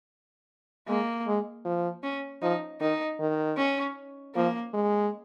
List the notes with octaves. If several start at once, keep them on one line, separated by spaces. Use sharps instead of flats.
G#3 A#3
G#3
F3
C#4
F3 D#4
D#3 D#4
D#3
C#4
F3 A#3
G#3